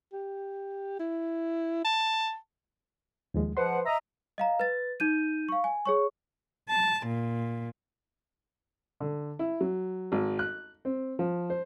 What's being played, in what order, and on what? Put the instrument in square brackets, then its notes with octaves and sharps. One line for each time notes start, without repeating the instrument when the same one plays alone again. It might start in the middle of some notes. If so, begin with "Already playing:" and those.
[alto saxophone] G4
E4
A5
[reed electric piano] D#2 F3 G#3
[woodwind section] G#2 F3 F#5 [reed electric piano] B4 C5 C6
[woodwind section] D#5 E5 A#5
[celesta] D#5 F5 A#5
B4 A6
D#4 G6 D#7
F5 C#6
G#5
G#4 C#5 C#6
[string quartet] A5
A#2
[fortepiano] D3
E4
F#3
G#1
F#6
C4
F3
C5